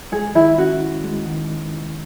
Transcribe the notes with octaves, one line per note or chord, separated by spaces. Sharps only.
G#3 G#4
D#3 E4
C#4 F#4
E4
G#3
D#3